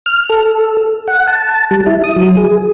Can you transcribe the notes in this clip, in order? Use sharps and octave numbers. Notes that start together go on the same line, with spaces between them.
F6
A4
F#5
A5
G3
E4
D#6
F#3
G#4